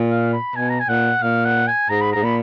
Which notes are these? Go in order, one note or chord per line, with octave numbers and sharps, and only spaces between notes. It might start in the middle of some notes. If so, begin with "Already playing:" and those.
Already playing: A#2
F5
B5
B2 G#5
A#5
G#5
A#2 F#5
A#2 F5
F#5
G#5
G#2 A#5
B5
G#2 A#5
A#2 B5